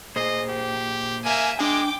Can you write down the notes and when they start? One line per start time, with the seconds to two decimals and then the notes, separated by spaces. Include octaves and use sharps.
0.16 A#2 G#4 C5 D#5
0.49 G4
1.25 A#3 E5 G#5
1.59 G#3 D4 G5 G#5 D6